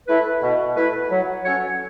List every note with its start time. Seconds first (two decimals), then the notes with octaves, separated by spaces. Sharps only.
0.08 A3 E4 B4
0.42 B2
0.76 A3 E4 B4
1.11 F#3
1.45 C#4 F#4 A4 C#5